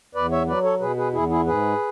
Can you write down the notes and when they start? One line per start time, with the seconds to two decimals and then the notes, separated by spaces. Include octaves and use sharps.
0.15 E2 B4 D5
0.31 C#5 E5
0.47 F#3 B4 D5
0.63 A4 C#5
0.80 B2 G#4 B4
0.97 G#4 B4
1.13 E2 E4 G#4
1.30 E4 G#4
1.46 G#2 G#4 B4